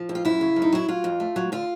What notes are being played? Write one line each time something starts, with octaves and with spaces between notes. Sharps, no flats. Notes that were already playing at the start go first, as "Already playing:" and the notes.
Already playing: F3
F2
F4
F#2 E4
C#3
F#2
D#4
F#3 E4
F#3 F4
F2
A3
F#3
D3 F4